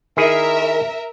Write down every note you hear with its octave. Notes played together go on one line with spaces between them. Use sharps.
D#3 E4 G#4 A#4 E5